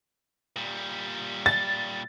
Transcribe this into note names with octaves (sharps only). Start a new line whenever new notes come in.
A#2 G3
A6